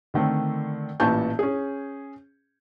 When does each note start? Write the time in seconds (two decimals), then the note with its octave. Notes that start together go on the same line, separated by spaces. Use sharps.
0.14 D3 D#3 A3 C4
1.00 A1 A#2 E3 A5 C#6 G6
1.39 C#4 G#4